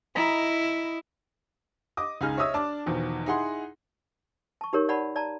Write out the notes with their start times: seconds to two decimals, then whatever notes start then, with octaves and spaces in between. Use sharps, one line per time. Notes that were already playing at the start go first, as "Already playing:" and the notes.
0.15 E4 D#5 A#5 B5
1.97 D#5 D6 D#6
2.21 C#2 D#4 G#4 F6
2.38 C#5 D#5 E5 D#6 E6
2.54 D4 A5 D6
2.86 E2 B2 D#3 F3
3.26 D#4 E4 G#4 F#5 C6
4.61 A5 C#6
4.73 D#4 G4 A#4 C#5
4.88 C#5 D5 F#5 A5 B5
5.16 D5 A5 A#5